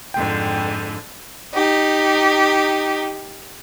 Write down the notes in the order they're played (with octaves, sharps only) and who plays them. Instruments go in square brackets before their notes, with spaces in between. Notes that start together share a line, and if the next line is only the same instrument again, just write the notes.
[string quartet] F2 G#2 D3 [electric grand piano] G5
[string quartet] D#4 G4